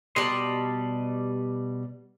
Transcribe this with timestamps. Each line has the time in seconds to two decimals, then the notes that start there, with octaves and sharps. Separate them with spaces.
0.16 B2 G3 D#5 A5 C6